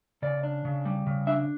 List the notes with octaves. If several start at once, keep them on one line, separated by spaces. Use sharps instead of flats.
C#3 D5
D4
C#3
G3
C#3
D4 E5